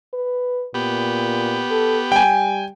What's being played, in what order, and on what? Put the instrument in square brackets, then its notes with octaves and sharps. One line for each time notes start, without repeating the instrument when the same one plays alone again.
[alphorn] B4
[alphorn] A#2 [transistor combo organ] B3 G4
[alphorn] A4
[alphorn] G3 [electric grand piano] G5 G#5